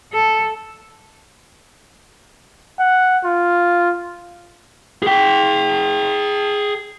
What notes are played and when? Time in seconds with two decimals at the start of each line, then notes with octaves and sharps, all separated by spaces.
0.13 A4
2.80 F#5
3.25 F4
5.03 G#4 G5